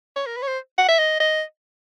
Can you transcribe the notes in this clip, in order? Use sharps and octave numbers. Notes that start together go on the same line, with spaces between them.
C#5
A#4
B4
C#5
C5
F#5
E5
D#5
D#5